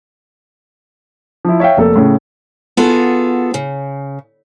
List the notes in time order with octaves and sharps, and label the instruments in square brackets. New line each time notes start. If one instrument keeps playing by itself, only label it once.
[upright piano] F3 E4
C#5 E5 F5 G5
F1 A#3 A4
A2 C#3
[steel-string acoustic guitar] B3 F4 F#4 G#4 A4
C#3